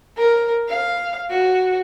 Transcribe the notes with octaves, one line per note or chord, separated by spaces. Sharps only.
A#4
F5
F#4